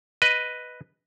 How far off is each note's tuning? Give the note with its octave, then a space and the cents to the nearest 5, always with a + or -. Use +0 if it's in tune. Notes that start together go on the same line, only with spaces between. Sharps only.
B4 +0 D#5 +0